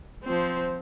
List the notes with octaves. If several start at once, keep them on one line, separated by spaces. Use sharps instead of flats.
F3 C4